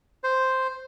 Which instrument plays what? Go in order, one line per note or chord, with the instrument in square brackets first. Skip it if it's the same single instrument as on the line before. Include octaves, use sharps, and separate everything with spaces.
[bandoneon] C5